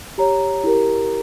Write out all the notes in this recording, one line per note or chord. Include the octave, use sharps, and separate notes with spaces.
G4 C#5 A#5
E4 G4 A#4